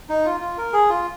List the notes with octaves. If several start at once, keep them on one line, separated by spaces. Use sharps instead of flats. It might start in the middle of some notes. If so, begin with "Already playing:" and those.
D#4
F4
F4
A#4
G#4
F4